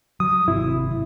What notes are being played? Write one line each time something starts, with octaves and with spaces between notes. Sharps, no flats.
F#3 D#6
G#1 C3 E4